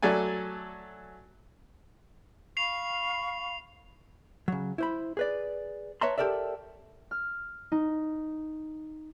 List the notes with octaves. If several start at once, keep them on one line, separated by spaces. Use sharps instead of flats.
F#3 A3 A4 D5 G#5
F5 B5 C#6 C7 F7
C#3 F#3
E4 C5 B5
G#4 B4 D5
B4 C#5 E5 A5 A#5 C6
G4 A4 A#4 D5 E5
F6
D#4